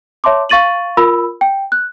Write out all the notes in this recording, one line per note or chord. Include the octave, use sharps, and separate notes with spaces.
C#5 E5 A5 C6 D6
F5 C#6 A6 D#7 F#7
F4 A#4 B5 E6
G5
F#6